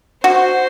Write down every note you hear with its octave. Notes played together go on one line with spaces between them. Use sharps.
F#4 C5